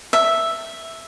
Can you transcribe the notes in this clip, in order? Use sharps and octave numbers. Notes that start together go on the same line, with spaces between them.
E5